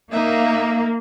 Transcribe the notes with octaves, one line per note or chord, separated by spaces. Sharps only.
A#3 D#4 E5